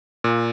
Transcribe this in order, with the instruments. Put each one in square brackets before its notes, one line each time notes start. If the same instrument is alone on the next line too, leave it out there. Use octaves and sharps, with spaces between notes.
[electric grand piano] A#2